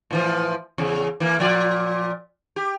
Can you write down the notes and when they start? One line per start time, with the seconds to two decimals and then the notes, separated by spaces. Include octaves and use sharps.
0.11 A2 E3 F3
0.78 E2 C#3
1.20 E3 A#3
1.39 A#2 F3 D5
2.56 G4